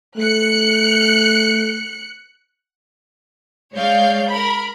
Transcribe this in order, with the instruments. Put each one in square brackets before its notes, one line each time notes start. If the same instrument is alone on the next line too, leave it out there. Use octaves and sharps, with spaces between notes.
[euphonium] A3 [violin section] F#6 C#7
[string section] G#3 C#5 D5 F5 G6
A#4 B5